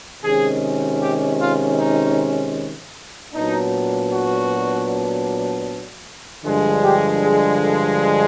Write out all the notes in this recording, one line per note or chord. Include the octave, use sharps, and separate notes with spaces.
C3 D#3 G#3 C#4 G#4
G4
F4
D#4
A#2 F#3 B3 D4 D#4
F#4
G2 D3 F3 G#3
G4
G#4
A4